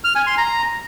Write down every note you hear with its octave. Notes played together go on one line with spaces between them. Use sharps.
F6
G#5
C6
A#5